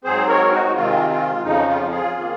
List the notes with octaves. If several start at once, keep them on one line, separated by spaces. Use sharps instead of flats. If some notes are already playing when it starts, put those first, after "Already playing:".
G#2 F#3 C4 G#4 C5
A#4 C#5
D#4 F#4
C3 D#3 G#3 C4 F4
F4
F2 C#3 F3 D#4
F4
F4 G#4
D#3 A#3